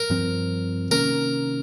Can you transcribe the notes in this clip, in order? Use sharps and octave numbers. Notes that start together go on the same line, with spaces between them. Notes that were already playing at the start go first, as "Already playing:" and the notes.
Already playing: A#4
G2 F3 C4
C3 D#3 A#3 C#4 A#4